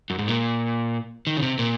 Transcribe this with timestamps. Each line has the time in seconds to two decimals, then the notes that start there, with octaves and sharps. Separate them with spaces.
0.10 F#2
0.19 G#2
0.27 A#2
1.27 D#3
1.37 C#3
1.42 C3
1.59 A#2